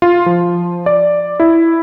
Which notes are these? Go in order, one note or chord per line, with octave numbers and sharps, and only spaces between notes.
F4
F3
D5
E4